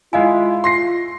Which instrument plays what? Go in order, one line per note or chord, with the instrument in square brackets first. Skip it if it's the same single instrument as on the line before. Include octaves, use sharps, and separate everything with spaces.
[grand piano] G#3 E4 [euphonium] F4 [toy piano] D#5 F5 G#5
[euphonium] F4 [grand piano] C6 A#6 C7